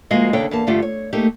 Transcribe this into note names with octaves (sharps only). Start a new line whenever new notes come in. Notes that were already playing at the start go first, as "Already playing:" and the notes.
D2 F3 G#3 A#3 F#4 D#5
D#2 C#3 D4 A4 C#5 G5
E2 A#3 A5
G2 D3 A3 F4 G4 F#5
C#5
A3 A#3 D#4 G4